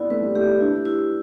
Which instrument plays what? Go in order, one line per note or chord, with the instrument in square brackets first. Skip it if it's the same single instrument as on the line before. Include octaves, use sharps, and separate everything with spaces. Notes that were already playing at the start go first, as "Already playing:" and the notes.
Already playing: [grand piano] B3 C4 [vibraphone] E4 D5
[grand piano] A3 [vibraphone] B4
[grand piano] G3
[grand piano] A3 [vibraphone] G4
[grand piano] E4
[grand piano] D4 [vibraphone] E4
[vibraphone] E4